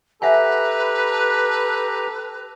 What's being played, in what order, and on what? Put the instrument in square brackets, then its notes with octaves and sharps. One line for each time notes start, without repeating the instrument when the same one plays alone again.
[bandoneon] G4 A#5 [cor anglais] A4 [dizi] B4 [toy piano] E5 F#5 G#5